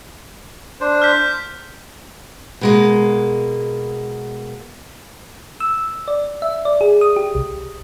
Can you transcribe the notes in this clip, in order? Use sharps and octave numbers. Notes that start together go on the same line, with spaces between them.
D4 C5
F6 G6 B6
B2 G#3 A#3
E6
D5
E5
D5
G#4
D#6
G4
C2